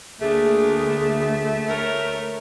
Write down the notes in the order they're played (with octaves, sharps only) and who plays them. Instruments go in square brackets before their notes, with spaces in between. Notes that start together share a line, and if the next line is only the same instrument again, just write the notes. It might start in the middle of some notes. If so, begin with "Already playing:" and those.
[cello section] D2 [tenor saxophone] A3 [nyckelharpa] A#3 D4 [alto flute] G#4
[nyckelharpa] A#4 C#5